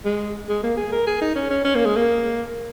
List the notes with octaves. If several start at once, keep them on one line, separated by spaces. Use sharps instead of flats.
G#3
G#3
A#3
G#4
A#4
G#4
D#4
C#4
C#4
C#4
A#3
G#3
A#3